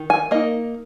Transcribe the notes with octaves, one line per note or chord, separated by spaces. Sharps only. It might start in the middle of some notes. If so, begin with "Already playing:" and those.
Already playing: D#3
G#5
A#3 D#4 D#5